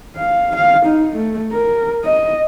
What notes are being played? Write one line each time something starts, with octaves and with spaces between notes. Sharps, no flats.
F5
F5
D#4
A3
A#4
D#5